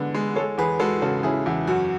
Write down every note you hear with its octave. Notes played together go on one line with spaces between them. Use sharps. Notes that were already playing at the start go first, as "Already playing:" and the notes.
Already playing: D3 G#3 B3 B4
G#3
G#3 A4 C#5
E2 G#4 B4
G#3 F#4 A4
C#3 F#4 A4
C#3 E4 G#4
E2 E4
F#2 F#4